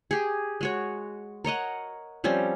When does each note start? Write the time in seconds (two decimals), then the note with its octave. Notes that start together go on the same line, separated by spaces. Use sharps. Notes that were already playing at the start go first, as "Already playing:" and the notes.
0.11 G4 G#4
0.61 G#3 F#4 C#5
1.44 A#4 C#5 D#5 F#5
2.24 F3 G3 C4 C#4